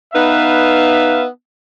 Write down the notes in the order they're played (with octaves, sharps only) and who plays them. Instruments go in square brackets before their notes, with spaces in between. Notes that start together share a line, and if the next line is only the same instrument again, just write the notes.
[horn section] B3 D#4 B4 E5 F5